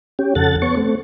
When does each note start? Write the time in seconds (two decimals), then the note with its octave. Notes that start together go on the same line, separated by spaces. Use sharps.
0.19 C#4 G4
0.35 F2 C#3 A4 F#5 A6
0.62 B3 C#5 C#6
0.77 A3 C4